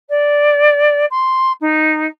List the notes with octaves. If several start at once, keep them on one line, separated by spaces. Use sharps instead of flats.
D5
C6
D#4